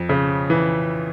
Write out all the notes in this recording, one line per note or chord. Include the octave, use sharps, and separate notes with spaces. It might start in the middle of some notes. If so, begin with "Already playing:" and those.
Already playing: F2
C#3
E3